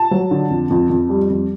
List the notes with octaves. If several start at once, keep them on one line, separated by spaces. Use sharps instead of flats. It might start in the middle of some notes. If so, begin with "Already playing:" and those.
Already playing: A5
F#3
D3
F2
F2
F2
G3
F2